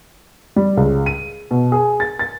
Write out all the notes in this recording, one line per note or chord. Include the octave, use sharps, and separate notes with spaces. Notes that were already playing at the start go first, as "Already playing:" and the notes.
G3
C#2
D#7
B2
G#4
A6
A6